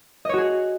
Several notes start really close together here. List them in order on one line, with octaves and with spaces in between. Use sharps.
D#5 C#5 F#4 G#4